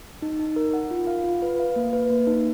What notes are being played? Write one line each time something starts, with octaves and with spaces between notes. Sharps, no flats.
D#4
D#4
A#4
F#5
F4
F5
F4
B4
F5
A#3
B4
A#3
D#4